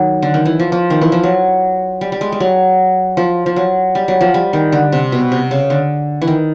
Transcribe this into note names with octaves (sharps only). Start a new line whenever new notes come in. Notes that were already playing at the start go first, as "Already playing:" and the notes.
Already playing: D#3 F#3
D3
D#3
E3
F3
F3
D#3
E3
F3
F#3
G3
G3
G#3
G3
F#3
F3
F3
F#3
G3
F#3
F3
G3
D#3
D3
C3
B2
C3
C#3
D3
E3
D#3